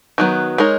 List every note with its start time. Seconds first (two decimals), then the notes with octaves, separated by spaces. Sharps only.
0.18 D#3 F#3 B3
0.58 G#3 D#4 A#4 C#5